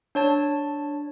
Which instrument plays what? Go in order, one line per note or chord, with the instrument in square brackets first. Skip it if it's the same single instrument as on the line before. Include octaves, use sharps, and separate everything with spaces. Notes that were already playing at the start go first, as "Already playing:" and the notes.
[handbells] D4 C#5 A5